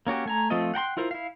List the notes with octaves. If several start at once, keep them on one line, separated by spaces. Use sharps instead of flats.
A#3 C#4 F#4 G4
A3 G#5 A#5
F3 A3 C4 F4 D#5
F#5 G5 A#5 C6
E4 F4 A#4 C5
E4 F5